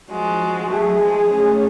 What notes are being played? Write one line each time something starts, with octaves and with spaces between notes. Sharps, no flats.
F3 G#3 F#4
F#3 A3 G#4
F3 G#3
A3 C#4